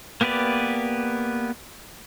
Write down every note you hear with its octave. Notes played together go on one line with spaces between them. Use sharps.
A#3 B3 G4 B4 D5